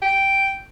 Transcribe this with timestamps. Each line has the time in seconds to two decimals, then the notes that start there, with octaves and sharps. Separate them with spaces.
0.02 G5